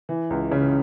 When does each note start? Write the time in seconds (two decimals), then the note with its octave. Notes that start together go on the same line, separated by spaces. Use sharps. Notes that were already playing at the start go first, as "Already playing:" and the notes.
0.09 E3
0.30 C#2
0.52 C#3